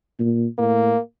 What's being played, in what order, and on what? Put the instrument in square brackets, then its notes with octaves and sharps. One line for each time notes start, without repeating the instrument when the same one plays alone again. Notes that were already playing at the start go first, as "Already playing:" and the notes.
[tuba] A#2
[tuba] A2 [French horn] A#3